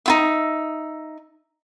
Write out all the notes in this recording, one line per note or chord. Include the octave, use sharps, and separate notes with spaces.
D#4 F4 E5